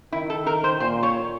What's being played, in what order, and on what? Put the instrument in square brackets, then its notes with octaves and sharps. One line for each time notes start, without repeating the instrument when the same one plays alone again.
[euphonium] D#3 [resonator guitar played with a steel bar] E4
[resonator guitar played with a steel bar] A4
A#4
C5
[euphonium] A#2 [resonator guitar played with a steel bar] C5
[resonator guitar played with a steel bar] C#5